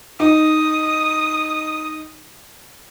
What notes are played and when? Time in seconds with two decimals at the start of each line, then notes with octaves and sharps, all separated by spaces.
0.20 D#4 D#6